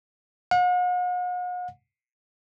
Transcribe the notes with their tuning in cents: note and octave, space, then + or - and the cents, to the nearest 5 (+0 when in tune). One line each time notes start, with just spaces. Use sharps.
F#5 -45